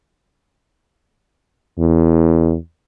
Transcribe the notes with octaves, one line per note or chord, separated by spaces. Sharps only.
E2